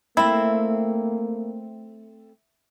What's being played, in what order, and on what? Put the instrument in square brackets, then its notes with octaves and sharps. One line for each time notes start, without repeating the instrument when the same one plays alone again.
[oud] A3 C4 [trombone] A#3 [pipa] E4